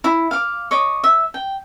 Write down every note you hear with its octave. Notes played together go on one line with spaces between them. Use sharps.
E4
F5 D6
C#5 D#5 D6
E5
G5